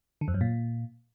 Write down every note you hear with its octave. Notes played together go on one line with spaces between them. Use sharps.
D3
F2
F#2
A#2